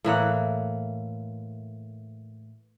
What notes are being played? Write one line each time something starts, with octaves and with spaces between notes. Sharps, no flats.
A2 E3 A#3 F#5